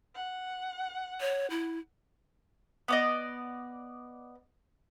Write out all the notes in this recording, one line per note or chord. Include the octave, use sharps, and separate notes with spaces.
F#5
C#5
E4
B3 D5 D#5